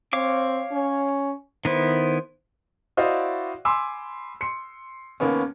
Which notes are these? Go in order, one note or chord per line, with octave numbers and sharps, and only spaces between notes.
C4 C#5 F5 D6
C#4
D#3 B3 E4 C5
E4 F#4 C5 D5 D#5 F5
G#5 B5 C6 D6 E6
C6 C#7
D#2 A#3 B3 C#4